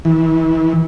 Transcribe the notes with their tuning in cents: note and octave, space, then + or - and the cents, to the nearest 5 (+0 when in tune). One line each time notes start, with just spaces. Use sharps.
E3 -35